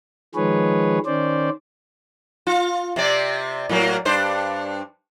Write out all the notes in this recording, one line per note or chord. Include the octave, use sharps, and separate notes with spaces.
D#3 F3 G#3 G#4 B4 C#5
D#3 C#4 C5 D5
F4
C3 C4 D5
A2 F#3 A#3
G2 D4 C5